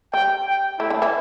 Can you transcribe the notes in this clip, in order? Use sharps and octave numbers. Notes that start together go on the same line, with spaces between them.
G3 G5
G5
A3 E4
D3 D4
E3 E4